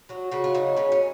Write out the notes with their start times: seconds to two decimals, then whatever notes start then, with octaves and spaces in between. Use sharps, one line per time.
0.09 F#3 F#4
0.31 C#3 F#4
0.44 F4
0.54 F#3 D#4
0.77 C#3 C#4
0.92 C#4